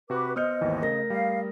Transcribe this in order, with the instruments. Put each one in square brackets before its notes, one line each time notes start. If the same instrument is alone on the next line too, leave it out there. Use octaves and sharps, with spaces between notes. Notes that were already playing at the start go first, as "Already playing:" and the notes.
[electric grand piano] C3 F#4 F#6 [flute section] B4 D6
[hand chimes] B3 C5 C#7 [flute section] D#5 [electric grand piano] D#6 F6 G6
[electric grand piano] G#1 D#2 E3
[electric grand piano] C#3 G#4 [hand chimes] A3 A#4 A#6
[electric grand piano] G3 [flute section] F5